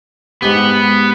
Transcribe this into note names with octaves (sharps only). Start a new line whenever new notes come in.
G#2 B3 G4